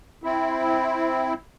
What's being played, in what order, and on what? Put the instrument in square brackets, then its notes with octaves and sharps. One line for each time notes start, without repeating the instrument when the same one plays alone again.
[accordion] C4 E4